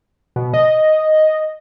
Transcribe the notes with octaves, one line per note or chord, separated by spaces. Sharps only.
B2
D#5